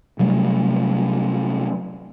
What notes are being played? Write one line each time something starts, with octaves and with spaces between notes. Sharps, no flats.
C3 F#3 G3 A3